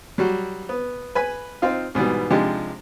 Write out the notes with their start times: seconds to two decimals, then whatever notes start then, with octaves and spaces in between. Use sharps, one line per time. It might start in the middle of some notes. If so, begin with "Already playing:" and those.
0.18 F#3 G3 F#4
0.69 B3
1.15 B4 G#5 B5
1.62 C4 D#4 F4 F5
1.95 G#2 B2 E3 G3
2.30 C3 F3 G#3 D4 D#4 G4